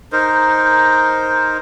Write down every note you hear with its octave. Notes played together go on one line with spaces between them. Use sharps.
D#4 A#4 C5